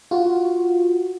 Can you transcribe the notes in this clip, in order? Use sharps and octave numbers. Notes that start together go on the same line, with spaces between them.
F4 F#4